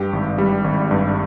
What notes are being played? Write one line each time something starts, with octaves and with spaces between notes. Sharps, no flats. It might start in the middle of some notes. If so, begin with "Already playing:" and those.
Already playing: G2 G4
G#1
G3
G#1
G2